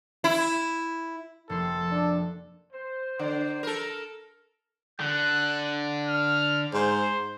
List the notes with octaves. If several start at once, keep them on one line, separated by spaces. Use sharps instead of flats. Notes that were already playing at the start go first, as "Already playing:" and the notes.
E4
F1 A#3 A4 C6
D4
C5
D3 C5 D5
A4 A#4
D3 F#6
F6
G#2 C5